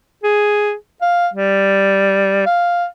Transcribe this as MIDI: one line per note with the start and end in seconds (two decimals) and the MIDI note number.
0.24 0.74 68
1.02 1.28 77
1.34 2.46 55
2.46 2.87 77